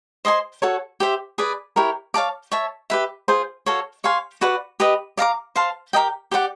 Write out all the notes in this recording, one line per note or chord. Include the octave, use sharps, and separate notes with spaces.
C5 D#5 G#5 C6
F#4 A4 C#5
G4 C5 E5
G#4 B4 D5
E4 G4 A#4 C#5
C#5 F5 A5 D6
C#5 E5 A5
G4 B4 E5
F4 G#4 C5
F#4 A4 C#5 F5
C#5 F5 G#5 C6
F#4 B4 D5 F#5
G4 B4 D#5
D5 F5 A#5 D6
C5 F5 A5 C6
G4 A#4 D#5 G5
G4 B4 D5 F#5